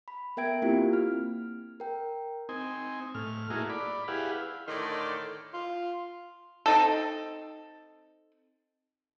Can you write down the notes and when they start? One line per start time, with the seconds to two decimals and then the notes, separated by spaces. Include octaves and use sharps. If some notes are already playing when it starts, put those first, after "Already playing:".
0.08 B5
0.37 B3 A#4 E5 G5 G#6 D7
0.62 A#3 C4 E4 F4 G4
0.93 F6
1.80 A#4 G5
2.49 C4 D#4 G#5
3.15 A2 F6
3.50 A3 A#3 D#4 E4 F#4 G#4
3.70 D5 B5
4.08 E4 G4 G#4 B4 F5 F#5
4.67 A2 D3 D#3 A4 D5 C6
5.53 F4
6.66 C4 D#4 A4